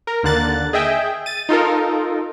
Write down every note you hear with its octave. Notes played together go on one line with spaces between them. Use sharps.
A#4
D#2 D3 A#3 F#6 A6
G#4 D#5 E5 G5
A6 D#7
D#4 F4 A4 A#4